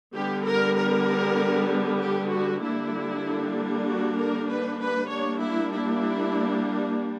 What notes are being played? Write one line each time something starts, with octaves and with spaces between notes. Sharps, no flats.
D3 G3 B3 G4
A#4
A#4
G4
F#4
D3 G3 A#3 D4 E4
F#4
A#4
B4
B4
G3 A#3 D4 C#5
E4
E4